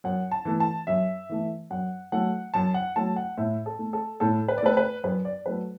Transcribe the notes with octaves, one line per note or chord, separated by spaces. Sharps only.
F#2 F#5
A5
E3 A3
A5
F#2 E5
E3 A3
F#2 F#5
F#3 A3 F#5
F#2 A5
F#5
F#3 A3 A5
F#5
A2 E5
A4
A3
A4
A2 A4
B4
D5
A3 B4
B4
F#2 B4
D5
F#3 A3 B4